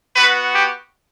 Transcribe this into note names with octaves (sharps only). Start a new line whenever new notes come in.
B3 F#4 B4
G4